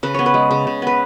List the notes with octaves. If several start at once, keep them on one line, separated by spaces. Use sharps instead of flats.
C#3 B4
B3 C#5
B4
G#3
C#3
C#3
B3 B4